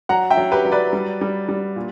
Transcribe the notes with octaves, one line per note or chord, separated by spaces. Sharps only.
F#3 F#5 A#5
E5 G5
F#3
G4 B4
F#3
B4 D5
G3
G3
G3
A#2